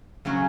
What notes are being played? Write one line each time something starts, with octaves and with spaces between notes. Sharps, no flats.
C#3 F#3 C#4 F#4